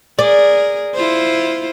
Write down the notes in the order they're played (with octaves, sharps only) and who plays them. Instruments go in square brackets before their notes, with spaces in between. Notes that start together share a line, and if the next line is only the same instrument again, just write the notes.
[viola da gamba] G#4 A#4 [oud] D5
[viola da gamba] E4 F4 C5